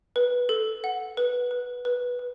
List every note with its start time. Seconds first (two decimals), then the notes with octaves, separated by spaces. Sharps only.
0.16 B4
0.49 A4
0.84 F#5
1.17 B4
1.51 B4
1.85 B4
2.19 B4